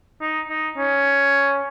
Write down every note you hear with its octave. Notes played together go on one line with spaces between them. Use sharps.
D#4
D#4
C#4